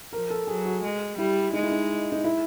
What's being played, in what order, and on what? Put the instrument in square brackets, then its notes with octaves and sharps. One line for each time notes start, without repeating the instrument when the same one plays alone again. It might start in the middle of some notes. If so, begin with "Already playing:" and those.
[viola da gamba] F3 [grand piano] A#4
[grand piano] A4
[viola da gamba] F#3 [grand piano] G#4
[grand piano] F#4
[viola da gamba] G#3
[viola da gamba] G3 [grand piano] E4
[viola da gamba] G#3 [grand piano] D#4
[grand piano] E4
D#4
D#4
E4